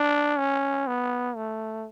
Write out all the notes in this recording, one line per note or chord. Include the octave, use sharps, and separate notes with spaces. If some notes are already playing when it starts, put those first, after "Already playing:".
Already playing: D4
C#4
B3
A3